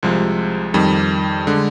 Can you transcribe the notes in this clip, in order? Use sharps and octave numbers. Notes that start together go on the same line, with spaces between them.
C2 C3 F3 G#3
F2 D#3 G3
D3 G#3